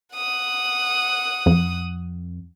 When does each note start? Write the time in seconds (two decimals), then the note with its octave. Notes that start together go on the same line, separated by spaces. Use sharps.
0.15 F#5 D#6
1.46 F2